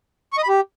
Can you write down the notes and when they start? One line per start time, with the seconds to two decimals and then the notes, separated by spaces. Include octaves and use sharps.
0.33 C#6
0.38 D#5
0.43 B5
0.48 G4